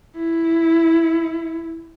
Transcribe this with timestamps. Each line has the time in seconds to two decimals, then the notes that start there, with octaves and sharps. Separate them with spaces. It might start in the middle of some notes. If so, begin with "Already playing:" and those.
0.16 E4